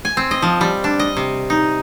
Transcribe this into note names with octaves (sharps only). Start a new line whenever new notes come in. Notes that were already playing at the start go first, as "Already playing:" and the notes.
G#5
C4
D#5
F3
G3
D4
D#5
C3
D#4